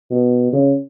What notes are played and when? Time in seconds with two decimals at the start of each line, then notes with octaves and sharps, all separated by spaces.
0.11 B2
0.53 C#3